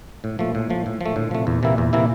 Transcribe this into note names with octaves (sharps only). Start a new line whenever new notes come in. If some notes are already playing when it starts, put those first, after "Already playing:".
A2
A#2 F3 A3
A2
F3 A3
A2
F3 A3
A2 D3
C3 F3 A3
E2 A#2
C3 E3 A#3 E4
E2
C3 E3 A#3 E4